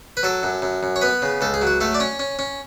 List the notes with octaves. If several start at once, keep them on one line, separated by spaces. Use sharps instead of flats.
B4
F#3 A4
F#2
F#2
F#2
C#5
B3 B4
C#3
C#2 A4
G#4
F#3
F#4
A3 A4
D5
C#4 C#5
C#4
C#4